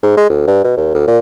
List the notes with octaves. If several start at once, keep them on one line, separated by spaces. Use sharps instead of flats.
G#2
G#3
D2
G2
B2
D#2
D2
A#2